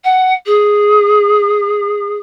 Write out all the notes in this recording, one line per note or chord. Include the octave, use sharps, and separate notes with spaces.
F#5
G#4